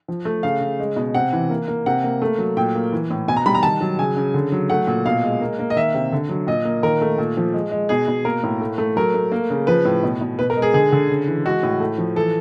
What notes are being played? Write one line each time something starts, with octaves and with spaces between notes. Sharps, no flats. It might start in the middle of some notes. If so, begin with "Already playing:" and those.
F3
A3
C#3 F5
C#3
G#3
B2
C3 F#5
E3
A#3
A#3
C3 F#5
A#3
A3
F#3
A#2 G5
A#3
E3
A2
B2 G#5
A#5
G3 B5
A#5
D#3 A5
F#3
C#3 G#5
C#3
D3
F#3
A3 F#5
A#2
B2 F5
G#3
A#3
A#3
D#5
D#3 E5
C3
D3
F#3
A#2 D#5
A#3
D#3 A#4
A3
A#2
F3
G#3
G#3
B2 G#4
B2
A#3 A#4
A2
A3
A3
F#3 A#4
A3
A#3
C#3
F3 B4
A2
B2
B2
B2 B4
A#4
G#3
G#4
D3 G#4
D3
C#3
E3
G#3 F#4
A2
A3
F3
E3 A4